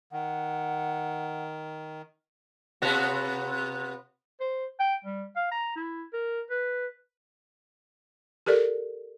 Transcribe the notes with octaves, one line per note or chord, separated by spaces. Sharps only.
D#3 F#5
C3 B3 F#4
C5
G5
G3
F5
A#5
E4
A#4
B4
G4 A4 A#4 D5